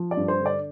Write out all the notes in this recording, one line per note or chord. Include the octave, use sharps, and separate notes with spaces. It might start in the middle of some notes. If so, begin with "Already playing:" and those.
Already playing: F3
D5
G2
C5
D3
D5